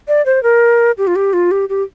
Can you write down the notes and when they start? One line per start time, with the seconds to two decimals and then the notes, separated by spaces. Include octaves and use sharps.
0.08 D5
0.26 C5
0.43 A#4
0.98 G4
1.07 F4
1.16 G4
1.33 F4
1.51 G4
1.69 G4